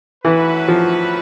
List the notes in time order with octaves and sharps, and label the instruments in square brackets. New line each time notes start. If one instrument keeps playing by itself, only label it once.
[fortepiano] E3 [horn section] F#3 A3 C#4 F#4 B4
[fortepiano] F3